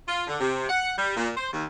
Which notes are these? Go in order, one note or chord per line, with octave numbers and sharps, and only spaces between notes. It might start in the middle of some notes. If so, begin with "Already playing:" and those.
F4
D3
C3
F#5
G3
A#2
C5
D#2